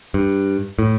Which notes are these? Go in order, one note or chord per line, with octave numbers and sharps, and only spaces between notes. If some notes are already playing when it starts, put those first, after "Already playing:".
G2
A2